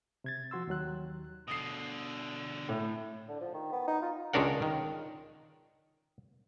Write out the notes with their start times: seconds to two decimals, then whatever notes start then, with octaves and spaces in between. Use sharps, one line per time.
0.24 C3 G#6 A6
0.51 F3 F#4 C6 E6
0.67 D#2 D#3 F#3 F#6
1.48 B2 D3 D#6 C7
2.69 A2
3.29 D3
3.40 F3
3.54 D#3
3.72 B3
3.87 D#4
4.02 F4
4.33 C#2 G#3 C#4 D4 A#4 F#5
4.62 D#3